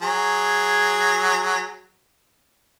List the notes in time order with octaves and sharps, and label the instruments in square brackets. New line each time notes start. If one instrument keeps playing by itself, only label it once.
[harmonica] F#3 G#4